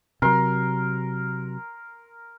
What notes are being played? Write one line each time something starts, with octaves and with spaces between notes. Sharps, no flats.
C3 F#3 A#4 C6